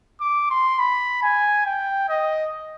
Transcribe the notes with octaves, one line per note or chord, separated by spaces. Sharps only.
D6
C6
B5
G#5
G5
D#5